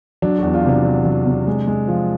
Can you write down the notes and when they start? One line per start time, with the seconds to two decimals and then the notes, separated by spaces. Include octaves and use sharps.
0.22 F#3 D4
0.39 E2 F#4
0.54 F4
0.65 C3 D4
0.85 F#3
1.05 F#3
1.26 C3
1.47 G#3
1.67 G#3
1.88 F3